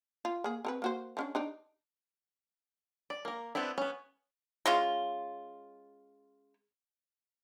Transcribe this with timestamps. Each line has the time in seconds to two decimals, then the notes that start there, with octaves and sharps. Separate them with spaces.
0.25 F4
0.44 A#3 G#4
0.65 C4 A#4 B4
0.82 A#3 F#4 C5
1.17 F3 C#4 D4
1.35 D4 D#4 D5
3.10 D5
3.25 A#3 A#4
3.55 B3 C4 D4 E4
3.78 B3 C#4
4.66 G#3 C#4 F4